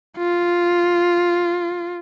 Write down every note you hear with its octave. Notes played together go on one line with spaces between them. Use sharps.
F4